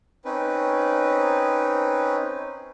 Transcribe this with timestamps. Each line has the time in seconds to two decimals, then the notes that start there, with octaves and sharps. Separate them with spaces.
0.25 C4 C#4 D#4 B4